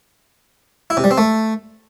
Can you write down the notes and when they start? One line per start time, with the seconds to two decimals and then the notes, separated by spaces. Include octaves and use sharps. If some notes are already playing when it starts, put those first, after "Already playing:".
0.90 E4
0.97 C3
1.04 G3
1.11 C4
1.18 A3